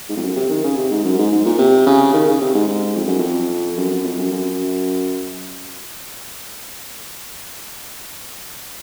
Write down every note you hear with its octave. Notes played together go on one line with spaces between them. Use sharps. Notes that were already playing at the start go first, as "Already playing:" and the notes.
G#2
F2
F#2
C3
D#3
C#3
C3
G#2
F#2
G#2
G#2
A#2
C3
C#3
D#3
C#3
C3
G#2
G#2
F2
F#2
F2
F#2
F#2
F2
F#2
F#2